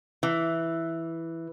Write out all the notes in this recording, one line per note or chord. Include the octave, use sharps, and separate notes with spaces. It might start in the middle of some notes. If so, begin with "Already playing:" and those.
E3